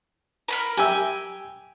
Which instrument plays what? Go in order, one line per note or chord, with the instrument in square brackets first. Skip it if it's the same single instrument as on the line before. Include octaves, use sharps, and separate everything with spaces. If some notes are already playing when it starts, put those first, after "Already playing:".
[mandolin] A#4 B5 F6
[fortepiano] G4 G5 E6 [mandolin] G#5